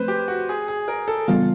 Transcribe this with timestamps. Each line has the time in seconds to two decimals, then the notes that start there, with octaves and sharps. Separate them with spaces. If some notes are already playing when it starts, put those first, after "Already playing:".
Already playing: F3 A3 C4 B4 C5
0.08 G4
0.28 F#4
0.49 G#4
0.68 G#4
0.88 A#4
1.08 A4
1.28 C#3 E3 G3 B3 F4